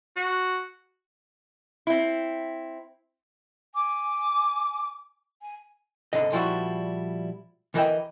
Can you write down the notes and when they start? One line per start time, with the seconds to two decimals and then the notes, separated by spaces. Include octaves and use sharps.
0.16 F#4
1.87 C4 E4
3.75 G#5 D6
5.41 G#5
6.13 C2 G#2 D3 D#5
6.32 A#2 F3 G3 E4 F#4
7.74 D2 E3 A#4 D#5 E5 G5